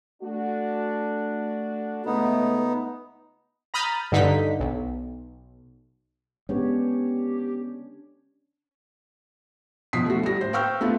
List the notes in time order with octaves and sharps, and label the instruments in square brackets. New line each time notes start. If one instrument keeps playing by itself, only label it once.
[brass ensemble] A3 D4 F#4
[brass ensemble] C#2 A3 [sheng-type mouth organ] B3 D#4
[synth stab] A#5 B5 D#6 F6 G6 A6
G2 D3 D#4 B6
B1
[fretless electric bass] G#3 B3 [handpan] C#4 D4 C#5 [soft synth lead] G4
[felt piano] B2 F3 D#6 B6 C7
A3 F#4
G3 A#6
A2 C5
F5 G5 C#6 E6 F6 G6
A3 B3 F4